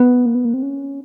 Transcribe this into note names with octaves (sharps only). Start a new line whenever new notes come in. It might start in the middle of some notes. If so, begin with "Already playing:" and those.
Already playing: B3
A#3
B3
A#3
C4
C#4